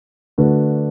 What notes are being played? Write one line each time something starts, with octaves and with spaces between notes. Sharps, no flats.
D3 A3 D4 F#4 B4